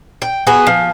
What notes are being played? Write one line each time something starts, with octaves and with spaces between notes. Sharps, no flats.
G5
B3 F#4 G#4 B4
F3